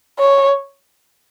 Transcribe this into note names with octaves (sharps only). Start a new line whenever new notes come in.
C#5